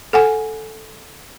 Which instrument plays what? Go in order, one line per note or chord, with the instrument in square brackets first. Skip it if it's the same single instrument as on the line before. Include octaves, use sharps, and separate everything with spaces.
[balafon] A4 F#5 G#5